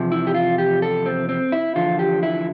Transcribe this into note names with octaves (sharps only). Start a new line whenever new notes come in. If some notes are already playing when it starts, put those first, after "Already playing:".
Already playing: E2 C3 F3
E4
G4
F4
G4
A4
C4
C4
E4
E2 D3 F3 F4
G4
E4